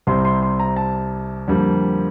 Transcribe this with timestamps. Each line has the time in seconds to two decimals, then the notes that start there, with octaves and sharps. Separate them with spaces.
0.07 C2 C3 G3 C4 C6
0.25 C6
0.43 C6
0.60 A#5
0.76 A5
1.48 F2 D3 G3 A#3